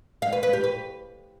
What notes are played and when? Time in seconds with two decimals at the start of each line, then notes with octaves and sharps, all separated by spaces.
0.22 F5
0.32 B4
0.43 B4
0.53 G4
0.64 B4